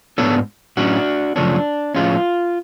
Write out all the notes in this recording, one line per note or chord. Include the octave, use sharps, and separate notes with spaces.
G#2 F#3 B3 D4 A4 C#5
A2 F#3 C#4 D4 F#4
F#2 C#3 F3 A3 C#4 D4
A2 F3 G#3 C#4 F4